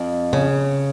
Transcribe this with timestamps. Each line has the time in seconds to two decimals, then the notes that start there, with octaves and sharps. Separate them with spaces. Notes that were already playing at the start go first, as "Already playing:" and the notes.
Already playing: F2
0.33 C#3